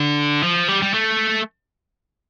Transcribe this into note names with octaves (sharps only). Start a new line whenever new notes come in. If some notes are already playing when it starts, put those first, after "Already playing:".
Already playing: D3
F3
G3
G3
A3